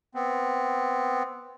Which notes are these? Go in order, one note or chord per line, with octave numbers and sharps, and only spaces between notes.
B3 C4